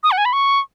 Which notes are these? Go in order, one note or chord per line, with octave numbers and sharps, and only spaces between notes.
D#6
F#5
G#5
B5
C#6